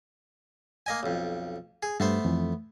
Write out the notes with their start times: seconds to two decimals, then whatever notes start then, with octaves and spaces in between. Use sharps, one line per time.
0.86 A#3 D#5 G#5
1.03 B1 F2
1.83 G#4
2.00 G2 A3 B3 C5
2.25 F2 E3